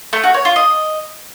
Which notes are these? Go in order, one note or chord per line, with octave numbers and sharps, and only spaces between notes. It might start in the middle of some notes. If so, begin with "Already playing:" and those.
A3
F#4
C#5
F4
D#5